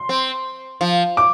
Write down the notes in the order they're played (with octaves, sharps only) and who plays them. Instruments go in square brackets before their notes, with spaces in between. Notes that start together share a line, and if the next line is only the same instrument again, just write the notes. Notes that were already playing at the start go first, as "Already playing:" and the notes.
Already playing: [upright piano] C6
[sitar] C4
F3
[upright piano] D6